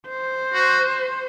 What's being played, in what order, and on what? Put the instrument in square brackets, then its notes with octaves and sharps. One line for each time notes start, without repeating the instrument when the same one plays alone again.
[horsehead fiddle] C5
[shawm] F#4